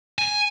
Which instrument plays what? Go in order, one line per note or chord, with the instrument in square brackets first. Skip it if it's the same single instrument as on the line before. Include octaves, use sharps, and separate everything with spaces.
[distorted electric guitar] G#5